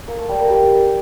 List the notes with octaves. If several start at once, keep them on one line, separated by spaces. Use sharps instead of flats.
A#3 A#4
A3 A4
G3 G4
A#3 A#4
G3 G4